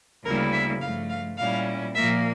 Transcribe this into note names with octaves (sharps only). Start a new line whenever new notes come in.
D2 C#3 G3 A#3 E4 A#4
E5
G2 F3 A3 F5
F5
A#2 G3 C#4 E4 F5
A#2 F3 A#3 E5